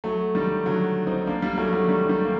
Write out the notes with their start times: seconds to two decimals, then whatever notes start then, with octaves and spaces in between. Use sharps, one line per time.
0.04 F#3 A3
0.35 D#3 G3
0.66 D3 F#3
1.07 C4 D#4
1.27 A#3 D4
1.42 G3 A#3
1.58 F#3 A3
1.73 F#3 A3
1.89 D#3 G3
2.09 D#3 G3
2.24 A#3